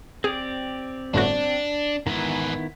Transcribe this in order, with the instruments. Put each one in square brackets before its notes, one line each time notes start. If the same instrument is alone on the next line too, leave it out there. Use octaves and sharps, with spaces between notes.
[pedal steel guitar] C4 G4 D5 [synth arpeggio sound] G#4
[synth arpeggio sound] G1 A2 F#4 [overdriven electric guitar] D4
[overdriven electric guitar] G#2 E3 [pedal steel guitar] D#3 B3 E4